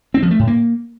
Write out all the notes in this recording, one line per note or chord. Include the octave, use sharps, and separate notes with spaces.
C4
F3
A3
A2
A#3